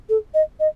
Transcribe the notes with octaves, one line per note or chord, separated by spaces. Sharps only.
A4
D#5
D#5